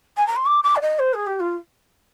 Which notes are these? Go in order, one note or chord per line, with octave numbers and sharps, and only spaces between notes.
G#5
A#5
C6
D6
D6
D5
D#5
C5
G#4
G4
F4